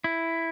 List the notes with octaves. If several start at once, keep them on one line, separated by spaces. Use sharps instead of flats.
E4